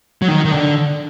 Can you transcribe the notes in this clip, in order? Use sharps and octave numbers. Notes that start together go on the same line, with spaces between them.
F#3
D#3
D#3
D3